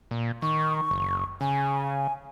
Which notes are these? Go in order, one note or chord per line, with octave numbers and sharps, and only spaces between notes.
A#2
D#3 C#6
F#1
C#3 G#5